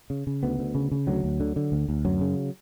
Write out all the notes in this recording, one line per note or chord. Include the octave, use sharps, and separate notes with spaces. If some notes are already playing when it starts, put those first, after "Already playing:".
C#3
C#3
D2 B3
D2
C#3
C#3
D2 F#3
D2
D3
D3
D2
D2
F#2 F#3
C#3